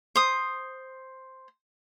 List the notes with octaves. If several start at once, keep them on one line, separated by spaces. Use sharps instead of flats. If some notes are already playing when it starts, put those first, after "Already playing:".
C5 D#6